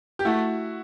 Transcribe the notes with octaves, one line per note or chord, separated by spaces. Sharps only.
G4
A3 E4 F#4